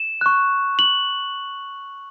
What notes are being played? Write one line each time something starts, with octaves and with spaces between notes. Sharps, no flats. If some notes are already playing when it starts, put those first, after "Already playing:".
Already playing: E7
C#6 F#6
F#7